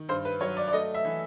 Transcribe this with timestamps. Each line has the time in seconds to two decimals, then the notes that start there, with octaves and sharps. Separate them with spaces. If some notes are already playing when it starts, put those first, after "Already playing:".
Already playing: D#3
0.09 G2 C5
0.25 B4
0.40 F#3 C#5
0.57 D5
0.68 D5
0.73 A3 D#5
0.95 E5
1.05 E3